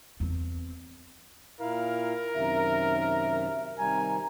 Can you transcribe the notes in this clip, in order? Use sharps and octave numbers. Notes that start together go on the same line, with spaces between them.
E2 C4
A#2 E4 A#4 F5
F#2 C3 D#3 E5
C3 D#3 G3 G#5 A#5